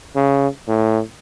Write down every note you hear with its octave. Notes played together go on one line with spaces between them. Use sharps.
C#3
A2